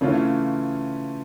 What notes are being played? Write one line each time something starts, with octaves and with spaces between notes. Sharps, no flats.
C#3 E3 A3 C#4 F4